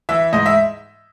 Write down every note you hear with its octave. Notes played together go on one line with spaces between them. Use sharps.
E3 E5
G#2 D#5
E5